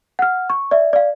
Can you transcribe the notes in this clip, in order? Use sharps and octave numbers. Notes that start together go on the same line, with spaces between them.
F#5 F6
C#6
D5 E5
D5 F5